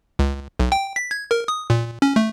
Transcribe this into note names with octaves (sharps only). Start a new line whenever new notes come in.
C#2
B1
G5
B6
G#6
A#4
D#6
A#2
C#4
A3